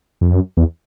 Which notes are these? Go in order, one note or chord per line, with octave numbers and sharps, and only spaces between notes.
F2
F#2
E2